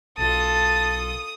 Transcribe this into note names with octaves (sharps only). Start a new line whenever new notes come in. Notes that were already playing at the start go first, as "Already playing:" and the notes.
B1 F4 A4 A5 D#6